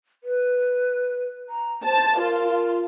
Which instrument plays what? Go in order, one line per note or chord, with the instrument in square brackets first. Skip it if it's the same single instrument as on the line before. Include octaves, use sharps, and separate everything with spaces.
[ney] B4
A#5
[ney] C5 [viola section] A5
[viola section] F4 [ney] A#4